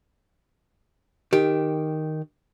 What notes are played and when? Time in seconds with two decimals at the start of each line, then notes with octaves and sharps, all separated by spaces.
1.33 D#3 G4